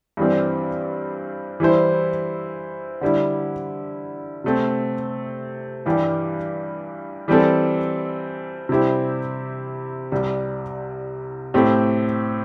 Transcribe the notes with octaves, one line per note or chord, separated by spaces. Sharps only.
G2 E3 G3 C4
E3 G3 E4 C5
D3 G3 E4
C3 A3 C4
G2 E3 G3 D4 G4
E3 G3 C4 A4
C3 G3 E4 G4 C5
C2 C3 G3
A2 A3 C4 G4